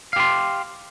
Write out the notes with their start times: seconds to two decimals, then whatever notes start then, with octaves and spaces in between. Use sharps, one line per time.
0.13 F5
0.16 G4
0.20 C6